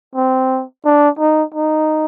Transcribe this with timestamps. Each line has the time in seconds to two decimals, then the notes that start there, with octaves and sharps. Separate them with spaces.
0.15 C4
0.85 D4
1.19 D#4
1.54 D#4